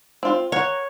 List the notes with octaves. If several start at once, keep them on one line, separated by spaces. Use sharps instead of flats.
C4 F4
A#4 C#5 F#5